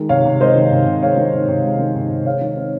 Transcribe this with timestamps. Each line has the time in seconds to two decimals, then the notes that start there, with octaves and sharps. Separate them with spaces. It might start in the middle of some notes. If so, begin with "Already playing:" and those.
Already playing: D#3 G#3
0.09 C3 C#5 F5
0.25 C3
0.40 G#3 C5 D#5
0.56 D#3
0.72 C3
0.87 C3
1.02 G#3 C#5 F5
1.18 D#3
1.34 C3
1.48 C3
1.64 G#3
1.79 D#3
1.95 C3
2.11 C3
2.26 G#3 C#5 F5
2.41 D#3
2.57 C4